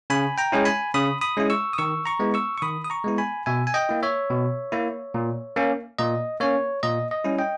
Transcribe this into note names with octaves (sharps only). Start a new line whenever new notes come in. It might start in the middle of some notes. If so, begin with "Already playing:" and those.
C#3 G#5 B5
G5 A#5
G#3 C#4 E4
G#5 B5
C#3 B5 D#6
B5 D#6
G#3 C#4 E4
C#6 E6
D#6
D#3 C#6 E6
A#5 C#6
G#3 B3 E4
C#6 E6
C#6
D#3 B5 D#6
D#6
A#5 C#6
G#3 B3 E4
G#5 B5
B2 E5 G#5
G#5
D#5 G5
A#3 E4
C#5 E5
B2
A#3 E4
A#2
A#3 C#4
A#2 D#5
A#3 C#4 C#5
A#2 D#5
D#5
G3 C#4 E4
D#5 G5